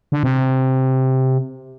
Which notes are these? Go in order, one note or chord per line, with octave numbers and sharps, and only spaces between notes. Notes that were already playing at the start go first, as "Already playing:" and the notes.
D3
C3